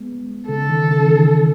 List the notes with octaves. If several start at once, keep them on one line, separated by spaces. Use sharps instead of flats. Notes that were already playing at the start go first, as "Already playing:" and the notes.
Already playing: G#3 B3
C#3 A4
D#3
C#3
E3
D#3